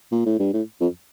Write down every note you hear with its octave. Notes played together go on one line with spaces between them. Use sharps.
A#2
A2
G2
A2
F2